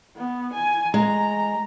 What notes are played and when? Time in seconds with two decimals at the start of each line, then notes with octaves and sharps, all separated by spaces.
0.16 B3
0.53 G#5
0.94 G#3 A#5